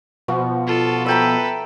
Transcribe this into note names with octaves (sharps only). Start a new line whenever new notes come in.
B2 F3 F#4
F4 A4
A4 B4 E5 G5 A#5